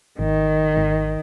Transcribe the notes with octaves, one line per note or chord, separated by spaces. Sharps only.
G#1 D#3
G#1